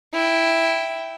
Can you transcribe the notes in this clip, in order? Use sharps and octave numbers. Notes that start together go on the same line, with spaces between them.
E4 G5